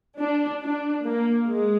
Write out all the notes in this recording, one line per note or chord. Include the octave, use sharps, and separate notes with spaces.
D4
D4
A#3
G#3